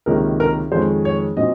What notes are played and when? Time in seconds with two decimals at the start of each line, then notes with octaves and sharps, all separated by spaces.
0.06 C#2 C3 D#3 A#3 C#4 A#4
0.40 A#4
0.72 F2 D#3 G#3 C#4 C5
1.05 C#5
1.37 A#2 F#3 C4 D#5